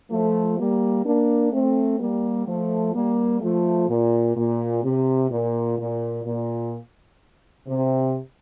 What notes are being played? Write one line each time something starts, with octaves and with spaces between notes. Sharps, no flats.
F3 A3
G3 A#3
A#3 D4
A3 C4
G3 A#3
F3 A3
G3 A#3
F3 A3
A#2
A#2
C3
A#2
A#2
A#2
C3